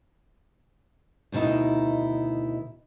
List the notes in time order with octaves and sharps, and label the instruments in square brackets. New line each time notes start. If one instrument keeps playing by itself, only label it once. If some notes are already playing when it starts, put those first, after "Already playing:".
[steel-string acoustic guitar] D2 B2 D#3 D#4 E4